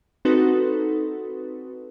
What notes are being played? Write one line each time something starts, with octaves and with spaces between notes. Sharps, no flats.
C4 D#4 F#4 A4 B4